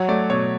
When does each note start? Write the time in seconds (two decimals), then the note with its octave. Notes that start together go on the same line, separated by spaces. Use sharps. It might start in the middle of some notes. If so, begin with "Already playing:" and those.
Already playing: F#3 C#5
0.08 A3 D5
0.30 B2 C#5